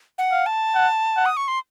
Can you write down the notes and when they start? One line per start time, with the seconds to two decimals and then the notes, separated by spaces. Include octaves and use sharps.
0.18 F#5
0.32 F5
0.46 A5
0.74 F#5
1.16 F#5
1.26 D#6
1.37 C#6
1.48 C6